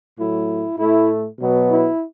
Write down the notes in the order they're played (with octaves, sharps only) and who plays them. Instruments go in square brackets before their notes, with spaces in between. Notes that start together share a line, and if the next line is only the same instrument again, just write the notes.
[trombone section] A2 F#3 A3 E4
A2 A3 E4
B2 F#3 B3
E4